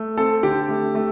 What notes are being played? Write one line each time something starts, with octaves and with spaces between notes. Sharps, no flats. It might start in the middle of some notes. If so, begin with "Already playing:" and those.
Already playing: A3
C4 A4
D3 G4
A3
A3